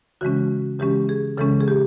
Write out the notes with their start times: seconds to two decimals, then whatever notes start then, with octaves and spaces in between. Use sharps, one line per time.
0.21 C#3 E3 G#3 C#4 F#4
0.79 C#3 E3 G#3 C#4 G4
1.09 G#4
1.37 C#3 E3 G#3 C#4 A4
1.61 G#4
1.68 G4